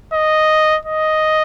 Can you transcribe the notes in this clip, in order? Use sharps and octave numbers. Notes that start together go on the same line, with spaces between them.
D#5
D#5